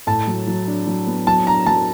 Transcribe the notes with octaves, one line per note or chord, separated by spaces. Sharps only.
A2 A5
F#3
F#3
D4
F#3
B3
F#3 A5
D4 A#5
F#3 A5